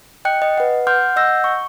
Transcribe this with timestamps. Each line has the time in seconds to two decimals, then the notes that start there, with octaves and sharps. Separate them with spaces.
0.25 D#5 G5 F#6 C#7
0.42 D#5
0.58 B4 F#5
0.87 F#5 C6 D6 F6 G6
1.16 D#5 F#5 E6 G6 A#6
1.44 C#6